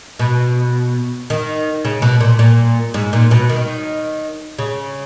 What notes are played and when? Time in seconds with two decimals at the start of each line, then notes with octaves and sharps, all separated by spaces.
0.19 B2
1.30 D#3
1.85 C#3
2.02 B2
2.20 A#2
2.39 A#2
2.94 G#2
3.13 A#2
3.31 B2
3.49 D#3
4.58 C#3